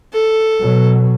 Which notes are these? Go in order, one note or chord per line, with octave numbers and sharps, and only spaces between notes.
A4
B2 F#3